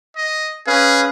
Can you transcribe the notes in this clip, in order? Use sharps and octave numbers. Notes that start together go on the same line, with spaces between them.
D#5
C#4 G#4 B4 F5